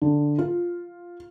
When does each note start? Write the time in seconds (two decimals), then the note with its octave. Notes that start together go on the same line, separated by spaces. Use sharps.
0.02 D3
0.38 F4